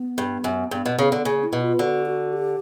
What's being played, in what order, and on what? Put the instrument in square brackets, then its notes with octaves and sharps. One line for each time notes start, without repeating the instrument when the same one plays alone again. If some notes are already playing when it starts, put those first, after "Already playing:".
Already playing: [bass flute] B3
[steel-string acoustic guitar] G2
F#2
[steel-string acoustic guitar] G2 [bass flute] B3
[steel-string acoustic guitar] B2
C#3
D3
[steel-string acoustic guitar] C#3 [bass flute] A#3
[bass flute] E4
[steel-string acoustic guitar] B2
[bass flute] F4
[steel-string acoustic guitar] D3 [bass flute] F#4
[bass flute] F#4
G4